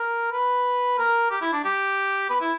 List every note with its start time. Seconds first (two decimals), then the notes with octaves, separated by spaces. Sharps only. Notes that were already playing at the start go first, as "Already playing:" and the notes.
Already playing: A#4
0.32 B4
0.99 A#4
1.31 G4
1.42 E4
1.53 D4
1.64 G4
2.30 B4
2.41 E4